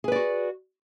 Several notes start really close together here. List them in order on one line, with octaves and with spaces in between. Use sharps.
G#4 B4 D5 F#4